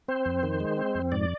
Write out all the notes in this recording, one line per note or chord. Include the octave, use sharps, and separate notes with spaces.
C4 C5
F2
D#3
G#3
C4
F2
G#2 D5